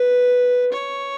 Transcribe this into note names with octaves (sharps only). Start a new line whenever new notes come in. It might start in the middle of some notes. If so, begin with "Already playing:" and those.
Already playing: B4
C#5